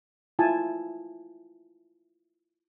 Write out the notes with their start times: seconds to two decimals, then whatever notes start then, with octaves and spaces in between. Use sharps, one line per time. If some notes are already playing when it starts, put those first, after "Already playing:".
0.39 E4 F4 G#5 A5